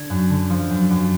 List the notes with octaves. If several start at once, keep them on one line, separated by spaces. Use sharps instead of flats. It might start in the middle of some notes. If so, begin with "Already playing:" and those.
Already playing: D3 G#6
F#2
D3
F3
F#2
F#2